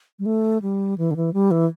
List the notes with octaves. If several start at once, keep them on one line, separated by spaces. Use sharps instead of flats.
G3
A3
G3
E3
D3
E3
G3
E3